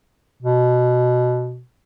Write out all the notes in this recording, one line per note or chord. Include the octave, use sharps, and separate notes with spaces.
B2